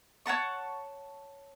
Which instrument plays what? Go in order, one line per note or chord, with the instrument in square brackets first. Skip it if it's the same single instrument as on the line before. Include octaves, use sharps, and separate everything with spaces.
[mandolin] C#5 F#5 A5 C#6